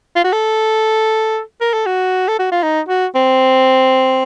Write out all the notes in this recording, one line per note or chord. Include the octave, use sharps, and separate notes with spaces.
F4
F#4
A4
A#4
A4
F#4
A4
F#4
F4
D#4
F#4
C4